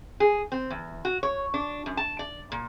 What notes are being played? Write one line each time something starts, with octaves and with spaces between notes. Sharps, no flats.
G#4
C4
E2
F#4
C#5
D4
F#2
A5
D5
A#2